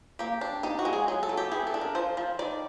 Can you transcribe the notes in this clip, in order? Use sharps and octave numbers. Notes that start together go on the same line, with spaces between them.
A#3 G4
D4
D#4 G4
F#4
G#3
G#4
F#3 G#4
A4
F#3
G4
E3 G#4
A4
D4
A#4
F3 C5
F3
D#3 D5